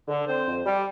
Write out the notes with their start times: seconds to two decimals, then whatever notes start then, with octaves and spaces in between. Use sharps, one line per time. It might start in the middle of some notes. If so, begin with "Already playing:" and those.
0.08 D3
0.27 D3 C4 C5
0.47 F2
0.66 G3